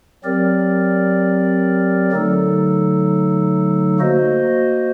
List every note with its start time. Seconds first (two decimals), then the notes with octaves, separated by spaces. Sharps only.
0.24 F#3 C4 G4 A#4 D5
2.12 D3 F#3 A3 D#4 A4
4.00 A#3 F#4 C5 D#5